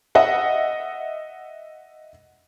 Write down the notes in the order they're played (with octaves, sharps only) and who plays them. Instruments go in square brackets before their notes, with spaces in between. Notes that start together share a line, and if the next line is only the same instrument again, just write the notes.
[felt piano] D#5 E5 F#5